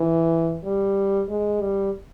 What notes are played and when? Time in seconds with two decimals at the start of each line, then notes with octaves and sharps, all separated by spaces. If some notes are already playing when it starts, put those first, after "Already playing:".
Already playing: E3
0.64 G3
1.29 G#3
1.61 G3